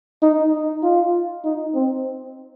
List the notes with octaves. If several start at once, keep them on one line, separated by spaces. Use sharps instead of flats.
D#4
D#4
F4
D#4
C4